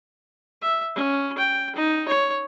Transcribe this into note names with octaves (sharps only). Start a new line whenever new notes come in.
E5
C#4
G5
D#4
C#5